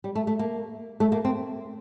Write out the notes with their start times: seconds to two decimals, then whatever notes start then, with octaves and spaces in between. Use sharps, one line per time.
0.04 G3
0.15 A3
0.27 A3
0.39 A#3
1.00 A3
1.12 A#3
1.25 C4